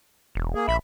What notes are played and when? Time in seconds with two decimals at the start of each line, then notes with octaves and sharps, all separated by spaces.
0.35 E1
0.55 A#3 G#4
0.68 A#1 E5 B5